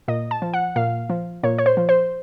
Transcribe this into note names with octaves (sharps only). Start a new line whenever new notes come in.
A#2 D#5
A5
F3
F#5
A#2 F5
F3
A#2 C#5
C#5
C5
F3
C5